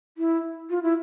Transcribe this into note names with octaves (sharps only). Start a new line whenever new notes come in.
E4
F4
E4